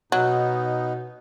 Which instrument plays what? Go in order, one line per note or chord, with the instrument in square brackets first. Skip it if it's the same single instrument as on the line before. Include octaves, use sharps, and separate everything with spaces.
[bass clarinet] B2 [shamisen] F#3 [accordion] B3 D#4